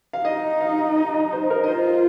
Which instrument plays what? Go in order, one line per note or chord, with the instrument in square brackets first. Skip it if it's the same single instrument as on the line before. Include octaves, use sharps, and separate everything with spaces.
[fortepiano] F5
[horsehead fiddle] D#4 [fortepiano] D#5
[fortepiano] F5
D#5
D#5
C5
A#4
D#5
[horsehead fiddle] F4 [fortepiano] C5